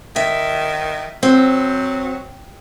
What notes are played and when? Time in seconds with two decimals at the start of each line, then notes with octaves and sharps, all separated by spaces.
0.16 D#3 E5
1.23 F#3 C4